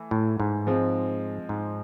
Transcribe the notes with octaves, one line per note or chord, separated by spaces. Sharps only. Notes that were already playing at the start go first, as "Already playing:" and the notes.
Already playing: E3 A3
A2
G#2
F3 G#3 C4
G#2